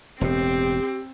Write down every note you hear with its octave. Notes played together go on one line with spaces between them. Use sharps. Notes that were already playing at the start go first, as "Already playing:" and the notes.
E1 A2 C4 G4